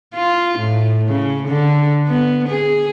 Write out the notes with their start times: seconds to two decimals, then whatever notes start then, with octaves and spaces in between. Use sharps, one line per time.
0.15 F4
0.58 A2
1.08 C#3
1.48 D3
2.07 B3
2.48 G#4